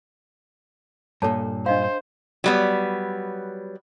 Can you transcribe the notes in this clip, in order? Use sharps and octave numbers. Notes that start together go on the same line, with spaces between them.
G2 A#2 A4 C#5 A5
D4 C5 D#5 F5
F#3 G3 B3